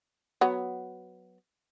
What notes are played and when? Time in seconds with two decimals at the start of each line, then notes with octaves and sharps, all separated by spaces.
0.41 F#3 B3